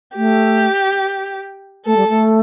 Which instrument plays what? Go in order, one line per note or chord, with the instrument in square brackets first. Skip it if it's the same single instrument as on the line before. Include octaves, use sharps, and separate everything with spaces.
[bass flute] A3 [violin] G4
[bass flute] A3 [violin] A4
[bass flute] G3
A3